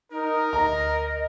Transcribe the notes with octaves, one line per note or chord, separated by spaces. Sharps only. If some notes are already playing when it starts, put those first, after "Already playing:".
D#4 A#4
D2 D#5 A#5